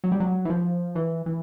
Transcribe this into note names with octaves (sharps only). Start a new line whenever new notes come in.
F#3
G3
F#3
E3
F3
E3
E3